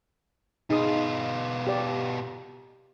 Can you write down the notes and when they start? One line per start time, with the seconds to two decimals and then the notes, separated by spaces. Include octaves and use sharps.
0.70 B2 D#4 F4 G#4 D#6
1.67 G4 D5